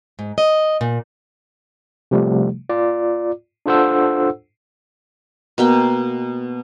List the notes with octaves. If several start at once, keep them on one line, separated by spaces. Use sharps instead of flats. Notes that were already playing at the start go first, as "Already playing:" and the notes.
G#2
D#5
A#2
C3 F3 G3 A3
F4 D5
D4 F4 A4 C5 F#5 E6
B2 A#3 G5